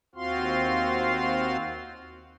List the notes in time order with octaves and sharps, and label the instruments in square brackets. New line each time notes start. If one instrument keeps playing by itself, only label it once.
[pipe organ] D#2 C4 F4 F#4 F5 C6